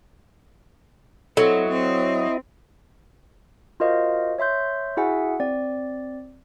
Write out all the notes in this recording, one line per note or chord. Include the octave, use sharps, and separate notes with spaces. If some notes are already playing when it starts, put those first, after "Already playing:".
F#3 C4 E4 A4 D#5
C4
F4 F#4 A#4 C5 D#5 F5
C#5 E5 C6 G6
E4 F#4 G#4 E5 F#5 G#5
C4 D5